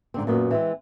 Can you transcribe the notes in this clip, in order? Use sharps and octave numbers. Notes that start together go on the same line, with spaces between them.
G#2 D3 C4
F#2 A#2 B3
E3 G#3 C4